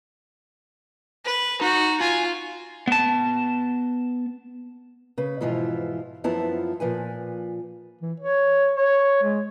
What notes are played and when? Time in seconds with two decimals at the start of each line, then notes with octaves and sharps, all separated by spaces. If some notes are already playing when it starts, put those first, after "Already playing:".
1.25 B4
1.61 D#4 F#4
2.01 F4 G#5
2.88 B3 A5
5.18 C#3 B4
5.41 G#2 B2 E3 F3 E4 F4
6.24 F#2 F3 B3 E4 F4 A5
6.80 A#2 F3 B4 G#5
8.01 E3
8.20 C#5
8.76 C#5
9.23 G#3